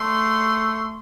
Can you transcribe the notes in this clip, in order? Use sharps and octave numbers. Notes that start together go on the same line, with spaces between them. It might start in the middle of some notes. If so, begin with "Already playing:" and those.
Already playing: A3 C6